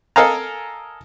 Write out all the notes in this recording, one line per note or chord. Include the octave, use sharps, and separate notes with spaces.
A4 A#4 D#5 F5 G#5 A#5